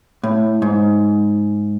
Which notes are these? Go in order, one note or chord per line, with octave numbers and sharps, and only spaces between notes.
A2
G#2